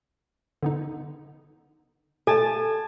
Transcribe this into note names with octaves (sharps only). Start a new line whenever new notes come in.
D3 B3 D#4
B2 A3 A4 G#5 A5